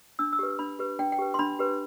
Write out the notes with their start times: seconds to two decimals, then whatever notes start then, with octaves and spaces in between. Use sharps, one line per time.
0.19 D4 E6
0.33 E6
0.39 G4 B4
0.59 D4 B5
0.79 G4 B4
0.99 D4 G5
1.12 G5
1.18 G4 B4
1.34 C6
1.39 D4 B5
1.59 G4 B4